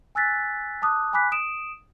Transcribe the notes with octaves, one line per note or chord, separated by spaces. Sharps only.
G#5 E6 F#6 A6 B6
A5 D6 D#6 F#6
G#5 B5 D6 F#6 B6
D#6 D7 E7